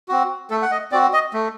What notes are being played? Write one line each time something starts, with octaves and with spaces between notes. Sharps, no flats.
C4 F#4
A3 A4
F#5
D#5
C4 F#4 D5
D#5
A3